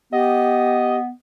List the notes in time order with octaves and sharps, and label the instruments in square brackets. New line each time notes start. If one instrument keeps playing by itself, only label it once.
[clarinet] B3 [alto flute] G4 [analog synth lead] D#5